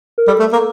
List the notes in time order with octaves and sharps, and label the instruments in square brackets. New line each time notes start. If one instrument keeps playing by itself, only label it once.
[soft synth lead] A#4
[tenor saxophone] G3 [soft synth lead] A4
[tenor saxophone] A3 [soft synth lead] A4
[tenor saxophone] A#3 [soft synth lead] A4